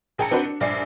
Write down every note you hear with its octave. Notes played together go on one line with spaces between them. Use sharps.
A#1 G#4 G5 A5 A#5 C#7
C4 D4 F#4 B4 C5 F#5
D4
A#1 G2 D5 E5 G#5 C7